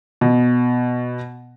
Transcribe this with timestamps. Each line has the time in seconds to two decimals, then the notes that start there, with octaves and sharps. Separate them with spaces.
0.21 B2